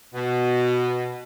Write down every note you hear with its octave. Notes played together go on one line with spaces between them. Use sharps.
B2